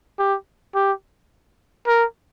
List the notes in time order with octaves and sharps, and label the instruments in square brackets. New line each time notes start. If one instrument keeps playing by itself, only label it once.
[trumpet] G4
G4
A#4